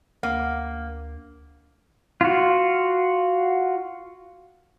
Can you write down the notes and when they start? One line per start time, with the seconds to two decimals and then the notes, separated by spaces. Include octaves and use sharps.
0.23 D2 A#3
2.21 F4 F#4